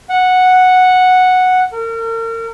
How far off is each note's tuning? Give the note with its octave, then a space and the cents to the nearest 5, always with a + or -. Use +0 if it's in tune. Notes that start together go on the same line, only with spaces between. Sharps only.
F#5 -5
A#4 -35